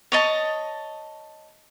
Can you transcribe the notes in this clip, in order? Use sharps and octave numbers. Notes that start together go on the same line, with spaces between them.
C#5 D#5 A5